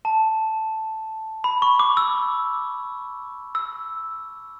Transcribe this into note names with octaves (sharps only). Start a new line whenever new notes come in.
A5
B5
C#6
D6
E6
E6